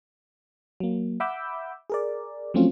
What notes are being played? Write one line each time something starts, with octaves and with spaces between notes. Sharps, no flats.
F#3 A#3
E5 F#5 B5 D6 E6 G6
G#4 A#4 D5
F3 F#3 A3 C4 C#4 F4